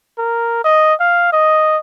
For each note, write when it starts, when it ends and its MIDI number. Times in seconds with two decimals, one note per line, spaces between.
0.18 0.63 70
0.65 0.94 75
1.00 1.31 77
1.33 1.78 75